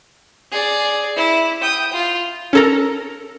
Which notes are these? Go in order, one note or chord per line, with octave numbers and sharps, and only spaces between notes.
G#4 D5
E4
G5 D#6
F4
C#4 A4 A#4